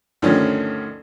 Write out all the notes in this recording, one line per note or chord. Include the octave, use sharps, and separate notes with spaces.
D2 G2 D#3 F3 C#4